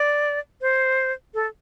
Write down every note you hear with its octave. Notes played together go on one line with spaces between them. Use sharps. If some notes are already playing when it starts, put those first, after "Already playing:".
Already playing: D5
C5
A4